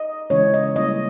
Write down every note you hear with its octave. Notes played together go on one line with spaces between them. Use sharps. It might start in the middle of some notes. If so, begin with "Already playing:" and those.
Already playing: D#5
C#3 E3 G#3 C#4 E4 C#5
D#5
G3 A#3 C#4 E4 D#5